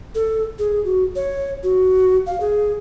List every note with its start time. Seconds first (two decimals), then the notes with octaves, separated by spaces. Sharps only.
0.15 A4
0.59 G#4
0.85 F#4
1.16 C#5
1.63 F#4
2.26 F5
2.40 G#4